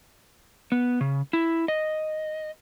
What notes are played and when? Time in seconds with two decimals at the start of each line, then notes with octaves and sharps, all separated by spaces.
0.72 B3
1.01 C#3
1.33 E4
1.68 D#5